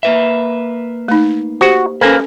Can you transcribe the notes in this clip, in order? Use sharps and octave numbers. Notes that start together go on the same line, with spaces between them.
A#3 B4 E5
A3 D#4
F#4 G4 C5
A#3 C#4 A4 B4 C5 G#5